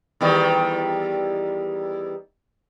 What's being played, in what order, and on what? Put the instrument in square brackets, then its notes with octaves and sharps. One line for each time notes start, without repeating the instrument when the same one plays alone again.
[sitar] E2 D#3 G3